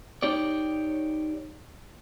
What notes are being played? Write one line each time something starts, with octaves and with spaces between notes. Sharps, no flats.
D#4 G4 C#5 D5